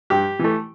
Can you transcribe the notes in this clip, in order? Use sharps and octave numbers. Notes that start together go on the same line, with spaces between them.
G2 G4
E3 A3